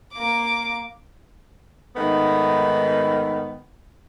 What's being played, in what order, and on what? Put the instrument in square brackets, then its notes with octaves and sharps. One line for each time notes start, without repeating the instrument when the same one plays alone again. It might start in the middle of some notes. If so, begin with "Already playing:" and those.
[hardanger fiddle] A#3 D6
[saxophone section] G#2 D#3 A3 B3